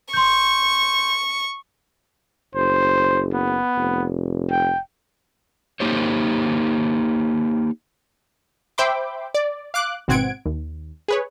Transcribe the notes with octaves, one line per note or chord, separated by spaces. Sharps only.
C6 C#6 G6
F#1 C5
B3
F1
G5
A#3 D#4 G4 C5 C#5
C5 E5 G5 B5 C6 D6
D5
F5 D6 F#6
G#1 B2 C4 F#5 G#6 D7
D#2
G#4 B4 C#5